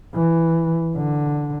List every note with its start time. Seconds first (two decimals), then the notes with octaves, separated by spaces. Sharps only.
0.15 E3
0.97 D3